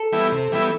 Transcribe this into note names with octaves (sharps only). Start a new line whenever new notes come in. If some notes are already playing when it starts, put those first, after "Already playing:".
Already playing: A4
E3 G3 B3 E4
C3
E3 G3 B3 E4